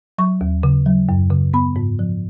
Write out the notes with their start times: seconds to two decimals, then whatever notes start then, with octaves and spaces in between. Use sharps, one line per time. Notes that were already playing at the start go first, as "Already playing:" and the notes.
0.18 F#3 C#6
0.41 D#2
0.63 C#3
0.86 F#3
1.09 F#2
1.31 C#3
1.53 B3 B5
1.76 G#2
1.99 F3